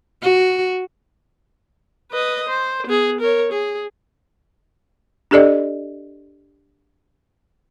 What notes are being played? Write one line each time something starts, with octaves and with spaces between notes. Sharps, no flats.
F#4
B4 D#5
C5
B3 G#4
A#4 C#5
G#4
D4 G4 A4 D5 D#5